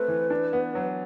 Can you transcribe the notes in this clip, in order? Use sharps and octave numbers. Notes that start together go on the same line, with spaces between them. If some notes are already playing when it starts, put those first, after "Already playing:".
Already playing: A3 C4 B4
E3
D4
B3
F#3